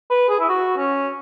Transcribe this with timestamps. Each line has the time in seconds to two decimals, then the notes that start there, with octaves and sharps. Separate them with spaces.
0.10 B4
0.29 G#4
0.40 E4
0.49 F#4
0.78 C#4